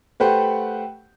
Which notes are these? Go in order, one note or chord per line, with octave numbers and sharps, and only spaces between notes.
A3 G4 B4 C5 F#5 G5